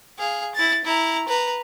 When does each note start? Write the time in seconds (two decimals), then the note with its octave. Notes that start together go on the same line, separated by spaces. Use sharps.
0.19 G#4 F5
0.55 E4 A6
0.84 E4 A#5
1.28 B4 A#5